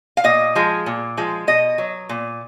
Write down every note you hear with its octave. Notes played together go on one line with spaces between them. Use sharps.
F5
A#2 D#5
F3 G#3
A#2
F3 G#3
B2 D#5
F#3
A#2